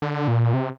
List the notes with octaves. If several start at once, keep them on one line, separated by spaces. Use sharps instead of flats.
D3
A#2
C3